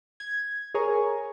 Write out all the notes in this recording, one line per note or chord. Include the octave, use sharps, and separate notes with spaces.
G#6
G#4 A#4 C#5 G#5 A#5 C#6